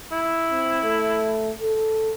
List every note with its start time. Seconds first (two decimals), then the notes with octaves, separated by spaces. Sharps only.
0.12 E4
0.50 C4
0.83 A3
1.61 A4